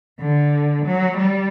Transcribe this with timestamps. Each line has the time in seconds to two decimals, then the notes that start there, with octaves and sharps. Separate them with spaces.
0.20 D3
0.85 F#3
1.17 G3